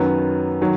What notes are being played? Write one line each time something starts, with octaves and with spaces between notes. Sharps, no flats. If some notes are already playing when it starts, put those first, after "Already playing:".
Already playing: F#2 D#3 F#3 B3
D#3 F#3